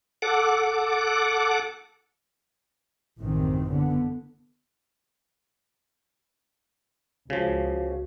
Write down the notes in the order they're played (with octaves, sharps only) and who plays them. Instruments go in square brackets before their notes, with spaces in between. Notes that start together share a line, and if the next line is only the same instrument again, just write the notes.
[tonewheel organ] A4 F#5 D6
[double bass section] A1 F#2 C3 D#3 E3 C4
D3 B3
[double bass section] C#2 [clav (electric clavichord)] C#3 F3 [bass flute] F#4